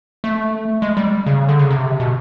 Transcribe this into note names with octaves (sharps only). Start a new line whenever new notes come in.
A3
G#3
G3
C#3
D3
C#3
C3
B2